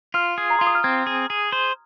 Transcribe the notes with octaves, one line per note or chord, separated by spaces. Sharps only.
F4 F6
G#4
A#5
F4 C6
D#6
F6
C4 G#6
G#4
G#4
C5